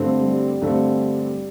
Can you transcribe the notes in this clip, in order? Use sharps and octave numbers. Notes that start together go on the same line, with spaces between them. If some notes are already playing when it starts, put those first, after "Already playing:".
Already playing: G2 D3 A3 C4
G3
G2 D3 A3 C4